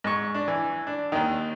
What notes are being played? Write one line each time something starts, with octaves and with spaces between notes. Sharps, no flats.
G#2 C#6
D4
E3
D4
D#2 D#3